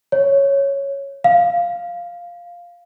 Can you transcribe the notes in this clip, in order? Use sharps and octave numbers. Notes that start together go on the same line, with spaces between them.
C#5
F5